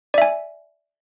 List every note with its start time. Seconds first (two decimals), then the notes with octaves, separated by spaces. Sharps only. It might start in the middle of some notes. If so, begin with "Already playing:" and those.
0.14 D5
0.18 E5
0.22 G#5